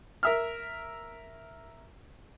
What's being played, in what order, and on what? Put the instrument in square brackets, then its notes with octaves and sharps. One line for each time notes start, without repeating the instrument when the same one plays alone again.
[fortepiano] A#4 E5 F6